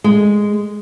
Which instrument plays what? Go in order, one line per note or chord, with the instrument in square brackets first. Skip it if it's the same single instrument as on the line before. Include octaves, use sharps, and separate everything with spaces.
[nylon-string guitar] G#3